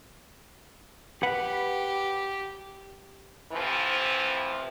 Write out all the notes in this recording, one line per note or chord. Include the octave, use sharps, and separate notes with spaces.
G4 B4 F#5
A2 C3 E3 F3